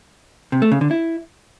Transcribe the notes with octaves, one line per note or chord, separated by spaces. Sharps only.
C3
A3
C#3
D3
E4